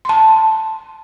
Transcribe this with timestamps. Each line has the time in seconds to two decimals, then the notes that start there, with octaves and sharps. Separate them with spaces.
0.05 A5 C6